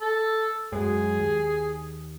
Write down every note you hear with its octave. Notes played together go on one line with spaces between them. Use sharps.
A4
F#2 F#3 G#3 G#4
D#2